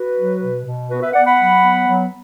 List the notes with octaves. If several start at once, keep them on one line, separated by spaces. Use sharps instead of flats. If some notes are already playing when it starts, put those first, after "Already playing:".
Already playing: F#4 B4
F#3
B2
B2
B3 F#4 B4
B4 E5
B3 D5 F#5
F#5 B5
F#3
B3
F#3